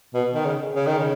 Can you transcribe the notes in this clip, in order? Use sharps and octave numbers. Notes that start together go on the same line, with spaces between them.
B2
D#3
C#3
C#3
D#3
C#3